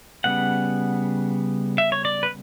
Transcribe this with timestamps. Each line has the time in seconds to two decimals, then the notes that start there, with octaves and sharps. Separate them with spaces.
0.24 C#3 G3 B3 F#5
1.78 E5
1.92 C#5
2.05 D5
2.23 B4